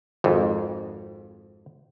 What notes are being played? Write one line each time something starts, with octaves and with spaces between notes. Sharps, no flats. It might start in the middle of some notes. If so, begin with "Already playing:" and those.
G#1 F2